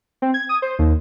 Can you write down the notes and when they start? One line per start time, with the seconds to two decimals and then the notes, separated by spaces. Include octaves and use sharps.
0.22 C4
0.34 G#6
0.49 D#6
0.62 C5
0.79 D#2